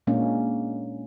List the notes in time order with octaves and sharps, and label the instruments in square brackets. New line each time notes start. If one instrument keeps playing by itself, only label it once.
[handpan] A#2 G#3 A#3 C#4 D4